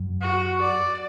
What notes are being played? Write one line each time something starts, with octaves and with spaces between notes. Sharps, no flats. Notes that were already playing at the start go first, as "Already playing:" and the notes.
Already playing: F#2
F#4
D5